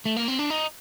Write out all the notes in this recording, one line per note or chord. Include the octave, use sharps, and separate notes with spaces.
A3
A#3
C4
D4
D#4